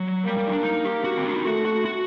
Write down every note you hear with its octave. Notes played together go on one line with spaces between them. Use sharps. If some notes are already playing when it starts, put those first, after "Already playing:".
Already playing: F#3
G3 A#3
G3
D#4
D4
D#4
G4
F#4
C4
D4
D#4
A3 F#4
F#4
F#4